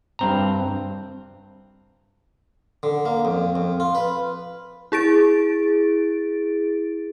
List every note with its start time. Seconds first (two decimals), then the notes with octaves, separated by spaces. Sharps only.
0.19 G2 C4 A#5
2.83 D3
3.05 A#3
3.25 F2
3.55 F2
3.80 F4
3.95 B4
4.92 E4 G#4 A6 D7